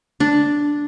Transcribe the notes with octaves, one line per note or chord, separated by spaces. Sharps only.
D4